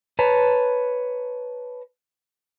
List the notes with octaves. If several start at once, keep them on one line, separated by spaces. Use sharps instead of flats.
B4 C#5 A5 A#5